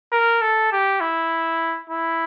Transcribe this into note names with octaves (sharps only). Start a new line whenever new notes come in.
A#4
A4
G4
E4
E4